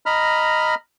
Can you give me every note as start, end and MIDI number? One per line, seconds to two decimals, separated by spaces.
0.06 0.75 75
0.06 0.75 82
0.06 0.75 83
0.06 0.75 89